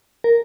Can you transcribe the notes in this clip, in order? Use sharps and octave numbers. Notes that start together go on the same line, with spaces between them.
A#4